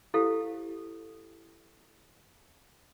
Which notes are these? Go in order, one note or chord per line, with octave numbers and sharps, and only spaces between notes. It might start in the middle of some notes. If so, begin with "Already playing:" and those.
E4 G4 A4 C5 F5